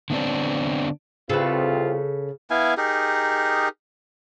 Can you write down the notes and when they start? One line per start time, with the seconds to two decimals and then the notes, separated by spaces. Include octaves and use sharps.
0.10 D3 B3 C4 D4
1.30 C2 C#3 C4 F4 A4 B4
2.50 B3 E4 F5 G#5
2.77 D#4 G4 G#4 A#4